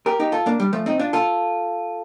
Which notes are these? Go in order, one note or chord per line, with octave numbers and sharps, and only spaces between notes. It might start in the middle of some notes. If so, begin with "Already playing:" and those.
G4 A#4
D#4 G4
F4 A4
A#3 D4
G3
F3 A3
C4 D#4
D4 F4
F4 A4